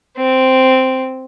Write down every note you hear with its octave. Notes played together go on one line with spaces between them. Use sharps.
C4